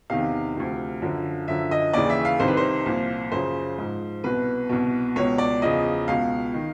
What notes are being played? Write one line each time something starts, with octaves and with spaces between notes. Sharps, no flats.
E2 C3 D#3 F5
D2 C3 F3
F#2 D3 F3
F#2 D3 F3 E5
D#5
D#2 C#3 E3 D5
E5
F5
C2 C3 D#3 C5
B4
C5
C2 A#2 F3
F#2 C#3 F3 C5
G#2 F3
C2 B2 B4
C2 B2
C#2 B2 C#5
D5
E2 C#3 F3 D#5
C#2 B2 F5
D#3